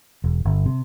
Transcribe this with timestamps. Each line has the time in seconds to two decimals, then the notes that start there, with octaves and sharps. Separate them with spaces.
0.24 E1
0.45 G1
0.66 C3